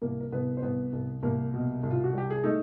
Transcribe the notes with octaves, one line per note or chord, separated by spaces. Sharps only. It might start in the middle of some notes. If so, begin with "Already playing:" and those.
C2 A#3 A#4
A#4
C2 B3 B4
C5
C2 B3 B4
C2
C2 A#3 A#4
B2
C2
F4
F#4
G3 G4
G#4
A3 D#4 A4